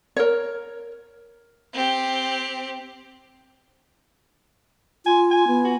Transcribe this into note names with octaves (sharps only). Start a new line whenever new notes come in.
A#4 C#5
C4 G4
F4 G#5
G#5
B3
F#4